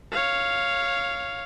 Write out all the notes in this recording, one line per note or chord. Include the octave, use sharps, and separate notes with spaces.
C#5 F5